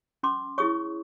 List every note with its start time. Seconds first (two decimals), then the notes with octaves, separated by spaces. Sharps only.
0.23 C#4 C6 D6
0.58 E4 G#4 C#5 C#6 D#6